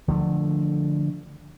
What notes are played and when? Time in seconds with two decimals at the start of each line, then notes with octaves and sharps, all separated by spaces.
0.08 D3 F3 A3